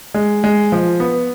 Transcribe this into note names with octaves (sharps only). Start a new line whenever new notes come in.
G#3
G#3
F3
B3